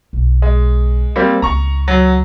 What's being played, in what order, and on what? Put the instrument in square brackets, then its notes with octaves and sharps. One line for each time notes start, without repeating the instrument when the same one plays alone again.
[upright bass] B1
[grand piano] G#3
G3 A#3 C4
[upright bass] C#2 [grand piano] A#5 C#6
[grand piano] F#3